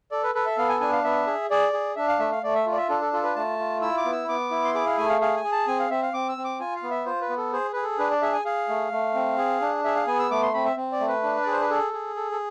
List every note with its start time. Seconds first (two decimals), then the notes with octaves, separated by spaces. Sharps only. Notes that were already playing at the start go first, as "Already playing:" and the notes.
0.11 A4 D5
0.23 B4
0.35 A4 B4
0.46 E5
0.58 B3 F5
0.69 G#5
0.81 D4 G#5
0.92 F5
1.04 B3 E5
1.27 G#4
1.50 G#4 D5
1.73 G#4
1.96 D4 E5
2.08 F5
2.19 A3 E5
2.32 F5
2.43 A3 D5
2.55 E5
2.66 F4
2.72 D5
2.77 E5
2.89 D4 A4
3.01 A4
3.13 F4 A4
3.23 B4
3.36 A3 A5
3.59 F4
3.82 E4 E6
3.97 D6
4.05 B3
4.12 E6
4.28 B3 D6
4.51 E4
4.65 C6
4.75 G#4 D6
4.86 F5
4.98 A3 G#5
5.09 F5
5.21 G#4 F5
5.36 G#5
5.44 G#4
5.52 A5
5.67 C4 G#5
5.79 F5
5.90 C4 E5
6.03 F5
6.13 C4 D6
6.29 E6
6.37 C4
6.44 D6
6.60 F4 G#5
6.76 F5
6.83 B3
6.91 E5
7.06 F4 C5
7.21 B4
7.29 B3
7.38 A4
7.53 G#4 C5
7.73 G#4 B4
7.83 A4
7.98 D4 B4
8.11 D5
8.22 G#4 E5
8.33 G#5
8.45 G#4 F5
8.69 A3
8.92 A3
9.14 C4
9.38 G#4
9.61 D4
9.84 G#4 E5
9.96 F5
10.07 B3 G#5
10.19 E6
10.31 A3 D6
10.42 C6
10.54 C4 B5
10.65 E5
10.76 C4
10.92 D5
11.00 A3
11.08 B4
11.23 D4
11.43 G#4 D5
11.52 C5
11.61 B4
11.70 G#4 A4
11.93 G#4
12.16 A4
12.32 A4